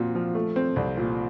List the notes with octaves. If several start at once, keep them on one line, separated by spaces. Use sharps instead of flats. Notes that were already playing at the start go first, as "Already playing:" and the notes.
Already playing: A#2 F3 C4 F#4
F3
A3
C4
C2
A#2